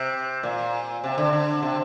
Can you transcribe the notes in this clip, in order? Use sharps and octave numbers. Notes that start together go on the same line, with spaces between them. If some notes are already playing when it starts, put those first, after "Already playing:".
Already playing: C3
A#2
C3
D3
D3
C3